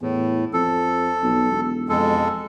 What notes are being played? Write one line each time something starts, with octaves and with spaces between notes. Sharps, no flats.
E2 A2
F2 A4
B1
E1
F2 G#3 A4